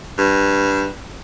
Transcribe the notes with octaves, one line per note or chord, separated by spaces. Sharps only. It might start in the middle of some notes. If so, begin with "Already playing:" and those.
G2